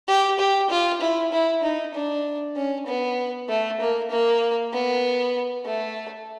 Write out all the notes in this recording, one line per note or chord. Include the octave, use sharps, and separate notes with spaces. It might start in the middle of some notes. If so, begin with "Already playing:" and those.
G4
G4
F4
E4
E4
D#4
D4
C#4
B3
A3
A#3
A#3
B3
A3